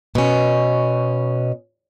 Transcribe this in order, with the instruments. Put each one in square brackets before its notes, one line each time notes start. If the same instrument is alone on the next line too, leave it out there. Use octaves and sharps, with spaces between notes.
[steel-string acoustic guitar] B2 C#4